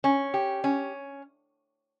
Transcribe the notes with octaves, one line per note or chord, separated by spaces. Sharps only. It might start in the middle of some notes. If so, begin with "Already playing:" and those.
C#4
G4
C#4